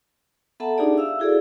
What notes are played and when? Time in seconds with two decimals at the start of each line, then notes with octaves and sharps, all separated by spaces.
0.60 B3 A4 E5 F#5 A5 A#5
0.78 D4 D#4 F4 G4 G#4 D5
0.98 E5 F5 E6
1.19 E4 F#4 G#4 A4 D5